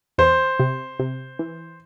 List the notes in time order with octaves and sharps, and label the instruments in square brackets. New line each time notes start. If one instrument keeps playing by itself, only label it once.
[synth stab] E2 [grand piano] C5
[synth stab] C3
C3
E3